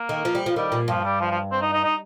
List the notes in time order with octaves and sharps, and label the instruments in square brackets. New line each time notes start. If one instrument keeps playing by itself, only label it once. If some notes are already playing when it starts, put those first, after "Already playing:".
Already playing: [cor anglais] A#3
[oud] D#3
F3
G3
F3
[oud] D#3 [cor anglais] G3
[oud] A#2
[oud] G2 [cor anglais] F3
[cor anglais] G3
F3
F3
C4
D#4
D#4
D#4